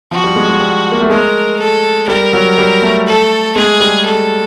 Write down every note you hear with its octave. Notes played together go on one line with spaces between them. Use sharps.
F3 F#4
G3
G#3
G#3
G3
A#3
A3
G#3 A#4
A4
G3 A#4
F#3
G3
A3
A4
G#3 G#4
G3
A4